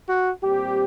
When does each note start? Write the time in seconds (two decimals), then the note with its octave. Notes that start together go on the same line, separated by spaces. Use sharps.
0.09 F#4
0.42 A#2 G3 C4 G4